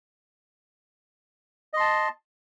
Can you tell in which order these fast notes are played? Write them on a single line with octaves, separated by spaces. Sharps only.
D#5 C6 A5